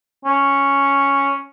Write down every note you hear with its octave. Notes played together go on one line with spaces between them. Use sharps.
C#4